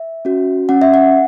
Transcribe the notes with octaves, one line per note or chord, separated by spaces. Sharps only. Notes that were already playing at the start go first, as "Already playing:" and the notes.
Already playing: E5
C#4 F#4
C#4 F#5
E5
F#5